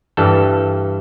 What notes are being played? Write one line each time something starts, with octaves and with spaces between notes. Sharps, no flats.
G2 E3 G3 A4